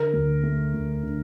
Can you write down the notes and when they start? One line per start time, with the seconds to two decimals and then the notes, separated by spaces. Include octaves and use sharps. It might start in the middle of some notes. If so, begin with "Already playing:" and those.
Already playing: D3 A#4
0.13 D2
0.43 A3
0.74 D2
1.03 D3